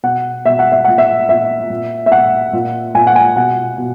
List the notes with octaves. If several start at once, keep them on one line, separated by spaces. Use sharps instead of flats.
B2 F#5
B2 E5
F#5
E5
A#2 F#5
E5
A#2 E5
A#2
E5
A#2 F#5
A#2
A#2 G#5
F#5
G#5
B2 F#5
B2